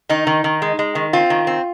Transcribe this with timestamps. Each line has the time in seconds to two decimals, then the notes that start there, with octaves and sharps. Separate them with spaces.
0.09 D#3 D#4
0.27 D#3
0.44 D#3
0.62 G#3
0.79 G#3
0.95 D#3
1.13 C4 F4
1.30 D#3
1.47 C4